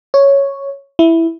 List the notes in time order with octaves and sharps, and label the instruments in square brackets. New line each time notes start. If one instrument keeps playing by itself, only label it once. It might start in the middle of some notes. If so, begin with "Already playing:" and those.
[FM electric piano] C#5
E4